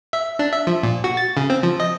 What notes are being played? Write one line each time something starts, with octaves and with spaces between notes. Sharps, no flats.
E5
D4
E5
F3
A#2
F#4
A6
C#3
C4
F3
D#5